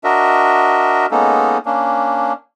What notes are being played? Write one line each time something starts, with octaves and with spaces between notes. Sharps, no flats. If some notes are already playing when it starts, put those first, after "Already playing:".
D4 F#4 A#4 D#5 E5
G#3 A#3 B3 C#4 D#4 A4
A#3 C#4 D4